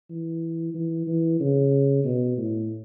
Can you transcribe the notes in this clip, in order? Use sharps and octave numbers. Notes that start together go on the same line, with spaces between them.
E3
E3
E3
C#3
B2
A2